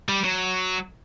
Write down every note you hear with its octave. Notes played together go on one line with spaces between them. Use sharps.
G3
F#3